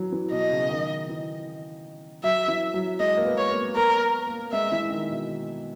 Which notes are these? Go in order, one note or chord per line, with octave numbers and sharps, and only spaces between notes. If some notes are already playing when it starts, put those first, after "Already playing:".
Already playing: E3 F#3
E3
B2 D#5
C#3
D#3
E3
F#3 E5
E3
F#3
G#3 D#5
A#3
B3
C#5
A#3
B3 A#4
A#3
G#3 E5
E3
D#3
B2